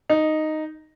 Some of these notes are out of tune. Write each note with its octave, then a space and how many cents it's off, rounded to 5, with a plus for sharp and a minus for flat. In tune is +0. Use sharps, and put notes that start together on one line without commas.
D#4 -5